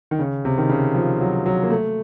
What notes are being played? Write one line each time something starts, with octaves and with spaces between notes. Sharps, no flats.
D#3
C#3
C3
D#3
C#3
F3
F#3
F#3
A#3
A3